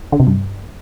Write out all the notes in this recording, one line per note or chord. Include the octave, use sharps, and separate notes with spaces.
D3
C3
G2